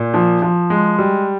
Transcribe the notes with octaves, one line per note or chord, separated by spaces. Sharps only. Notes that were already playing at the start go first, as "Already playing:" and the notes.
Already playing: A#2
F3
F3
G#3
G3